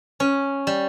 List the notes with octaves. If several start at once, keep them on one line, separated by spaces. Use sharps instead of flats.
C#4
G3